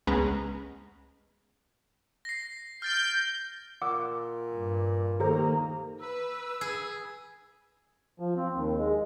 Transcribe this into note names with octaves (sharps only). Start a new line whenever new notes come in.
C#2 G#3 B3 C#4 B4 A#5
A#6 C7
F6 G6 A6 D7
A#2 F#5 D6 E6
G2
D#3 A#3 G4 A4 C5 A#5
B4 E6
G#4
F3
C4
D#2
G#3